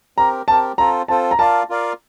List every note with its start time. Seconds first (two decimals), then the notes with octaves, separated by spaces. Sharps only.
0.17 C4 G4 A#4 A#5
0.48 C4 G4 A#4 A5
0.78 C4 F4 A4 C5 A#5
1.08 C4 F4 A4 C5 A5
1.31 A#5
1.39 F4 A#4 D5 F5 A5
1.69 F4 A#4 D5 F5